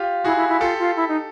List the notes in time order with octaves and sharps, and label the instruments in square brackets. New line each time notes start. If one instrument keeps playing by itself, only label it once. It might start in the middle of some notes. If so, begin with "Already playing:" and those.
Already playing: [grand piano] F4 G4
[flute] E4 [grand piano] F#4 G#4
[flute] E4
E4
[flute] F4 [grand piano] G4 A4
[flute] F4
E4
D#4